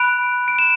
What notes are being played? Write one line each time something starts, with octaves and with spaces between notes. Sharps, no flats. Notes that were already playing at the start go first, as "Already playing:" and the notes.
Already playing: B5 F#6 D7
D7
E7